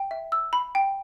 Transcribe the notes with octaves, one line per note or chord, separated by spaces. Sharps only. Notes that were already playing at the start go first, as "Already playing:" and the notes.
Already playing: G5
E5
E6
B5
G5